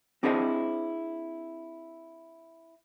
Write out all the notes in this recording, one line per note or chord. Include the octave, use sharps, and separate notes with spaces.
C4 D4 E4 G#4 C5 D#5